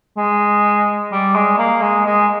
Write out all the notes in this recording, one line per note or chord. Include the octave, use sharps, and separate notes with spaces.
G#3
G3
G#3
A#3
G#3
G#3